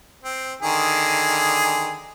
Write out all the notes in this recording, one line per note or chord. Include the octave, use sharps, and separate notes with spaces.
C4
D3 D#3 G#4